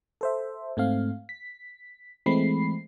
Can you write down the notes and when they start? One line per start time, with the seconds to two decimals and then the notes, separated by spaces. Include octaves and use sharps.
0.21 A4 C5 E5
0.77 G#2 A3 C4 F5
1.29 B6
2.26 E3 G#3 A3 C4 B5 C7